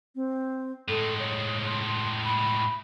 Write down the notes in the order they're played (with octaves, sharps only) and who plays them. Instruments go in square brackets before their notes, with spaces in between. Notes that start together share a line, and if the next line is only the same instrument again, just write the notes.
[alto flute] C4
[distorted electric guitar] A2 G#3 [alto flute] A4
[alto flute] C#5
C6
B5